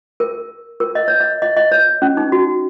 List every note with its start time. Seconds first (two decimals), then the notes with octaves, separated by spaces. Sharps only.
0.20 A#4
0.80 A#4
0.95 D#5
1.08 C#5
1.20 D#5
1.42 D#5
1.57 D#5
1.71 C#5
2.02 C#4
2.17 D#4
2.32 F#4